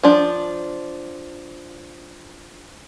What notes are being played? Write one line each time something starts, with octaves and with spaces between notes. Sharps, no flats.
F3 D4